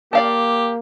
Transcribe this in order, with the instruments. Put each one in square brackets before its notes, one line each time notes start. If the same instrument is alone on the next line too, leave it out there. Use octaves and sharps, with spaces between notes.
[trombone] A#3 [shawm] G4 [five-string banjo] D5 F5 A5